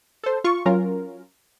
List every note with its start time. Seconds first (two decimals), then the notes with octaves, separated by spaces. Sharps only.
0.24 A4 C5
0.44 F4 C#6
0.66 F#3 C#4 F4 A#4